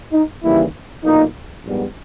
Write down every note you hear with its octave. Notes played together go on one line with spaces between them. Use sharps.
D#4
D#2 C#3 E3 G3 A#3 E4
B1 A#2 A#3 D#4
A#1 G#2 G3 B3